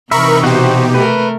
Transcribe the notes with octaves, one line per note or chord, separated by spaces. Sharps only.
C3 E3 D#4 A#4 E5 B5 C#6
B2 F#4 G4 C5
A3 A#4 B4